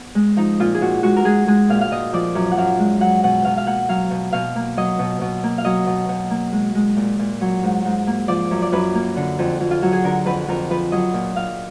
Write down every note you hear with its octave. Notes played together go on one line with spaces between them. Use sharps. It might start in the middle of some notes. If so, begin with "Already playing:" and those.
Already playing: B3
G#3
F3 D#4
A#2 F4
G#4
A#2 F#4
G#3 F#4
A#4
G#3 G#4
G#3 G#4
A#2 F5
F5
A#2 D#5
F3 D5
F#2
F#5
F#2 F5
G#3
F#3 F#5
B2 F#5
B2 F5
F5
A#3 F#5
F#3 F5
B2
B2 F5
A#3
F#3 D#5
B2
B2
A#3
F5
F#3 D#5
B2
B2
A#3
G#3
G#3
A#2
A#2
F#3
G#2
G#2
A#3
F3 D5
F#2
D5
F#2 B4
A#3
D3
F2
F2
F4
F#3 F#4
G#4
D3 A#4
F2 B4
F2 A#4
F3 B4
F#3 D#5
A#2
A#2 F5